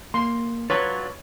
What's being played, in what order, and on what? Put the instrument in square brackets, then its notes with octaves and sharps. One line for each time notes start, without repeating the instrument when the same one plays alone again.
[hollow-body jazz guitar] A#3 [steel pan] C6
[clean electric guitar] F#3 D4 F4 [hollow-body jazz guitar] B4 [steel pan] C#5